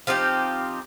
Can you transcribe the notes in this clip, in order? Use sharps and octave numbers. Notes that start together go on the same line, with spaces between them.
F3 C4 D#4 G4